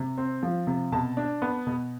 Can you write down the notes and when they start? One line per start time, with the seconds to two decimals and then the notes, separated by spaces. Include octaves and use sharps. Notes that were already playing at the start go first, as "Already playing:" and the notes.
Already playing: C3
0.18 C4
0.43 F3
0.67 C3
0.92 B2 A5
1.17 D4
1.42 B3
1.67 B2